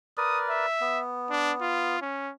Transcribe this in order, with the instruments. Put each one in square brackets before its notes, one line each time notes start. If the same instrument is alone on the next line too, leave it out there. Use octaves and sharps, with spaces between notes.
[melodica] A#4 B4 D5 [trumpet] D#6
[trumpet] E5
[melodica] B3
[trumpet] D4
F4
C#4